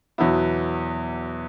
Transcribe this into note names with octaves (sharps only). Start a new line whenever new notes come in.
E2 B2 F#3 B3 E4